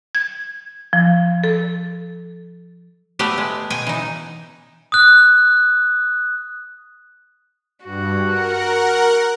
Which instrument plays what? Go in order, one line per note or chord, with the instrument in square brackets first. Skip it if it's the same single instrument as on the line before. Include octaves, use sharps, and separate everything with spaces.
[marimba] G#6
F3
A4
[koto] A3 B3 G4
G#3
B2 G5 G#5
E3 D#4
[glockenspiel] D#6 F#6
[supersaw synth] G2 [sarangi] F#4
[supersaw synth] A#4 F#5